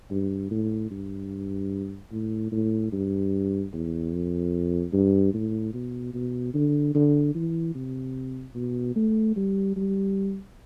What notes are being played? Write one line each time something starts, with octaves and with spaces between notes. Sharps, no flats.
G2
A2
G2
A2
A2
G2
E2
F2
G2
A2
B2
B2
D3
D3
E3
C3
B2
A3
G3
G3